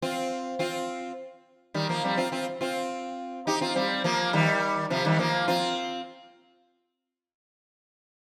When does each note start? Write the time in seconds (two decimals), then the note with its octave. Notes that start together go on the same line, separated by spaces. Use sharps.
0.02 C4 F4
0.59 C4 F4
1.74 D#3 G3
1.89 F3 A#3
2.04 G3 C4
2.17 C4 F4
2.32 C4 F4
2.61 C4 F4
3.47 D#4 G4
3.61 C4 F4
3.76 G3 C4
4.04 F3 A#3
4.33 D#3 G3
4.90 C3 F3
5.05 D#3 G3
5.19 F3 A#3
5.48 C4 F4